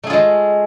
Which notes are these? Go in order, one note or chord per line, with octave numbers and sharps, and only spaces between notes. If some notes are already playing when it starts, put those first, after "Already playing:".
G#3 A3 F4 G#4